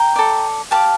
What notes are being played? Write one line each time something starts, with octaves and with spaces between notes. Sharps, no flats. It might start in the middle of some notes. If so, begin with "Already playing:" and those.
Already playing: G5 A#5
A4 D5
G4 D5 F5 A5